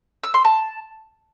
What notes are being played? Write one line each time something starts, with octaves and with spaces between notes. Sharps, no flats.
E6
C6
A5